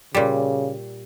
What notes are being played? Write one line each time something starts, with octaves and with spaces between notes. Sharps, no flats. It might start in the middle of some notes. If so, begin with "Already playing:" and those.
A#2 C#3 G3